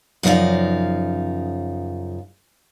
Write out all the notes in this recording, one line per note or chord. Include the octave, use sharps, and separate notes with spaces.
F#2 C#3 F3 D#4 D5 F5